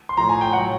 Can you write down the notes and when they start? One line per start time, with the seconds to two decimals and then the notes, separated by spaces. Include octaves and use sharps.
0.09 C6
0.17 A2 F3 A#5
0.29 G#5
0.41 G5
0.53 A2 F#3 F#5